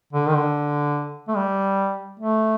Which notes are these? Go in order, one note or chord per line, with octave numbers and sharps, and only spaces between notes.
D3
D#3
D3
A3
G3
A3